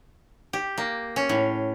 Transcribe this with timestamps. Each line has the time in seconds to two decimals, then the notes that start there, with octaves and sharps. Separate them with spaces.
0.53 G4
0.78 A#3
1.16 C#4
1.29 A2